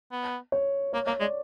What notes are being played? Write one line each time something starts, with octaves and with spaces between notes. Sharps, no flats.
B3
C#5
A#3 C#5
A#3 C#5
G#3 D5